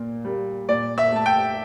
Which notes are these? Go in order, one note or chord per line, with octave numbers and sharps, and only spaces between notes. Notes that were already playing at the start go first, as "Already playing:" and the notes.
Already playing: A#2 A#3
G3 A#3
A#2 D5
E5
A3 A5
G5